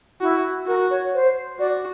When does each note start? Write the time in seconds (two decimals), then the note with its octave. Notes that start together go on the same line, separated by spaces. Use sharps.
0.21 E4 F#4
0.67 F#4 A#4
0.90 C#5
1.13 C5
1.59 F#4 D5